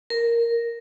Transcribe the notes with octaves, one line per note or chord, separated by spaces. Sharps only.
A#4